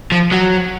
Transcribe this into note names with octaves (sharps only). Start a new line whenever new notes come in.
F3
F#3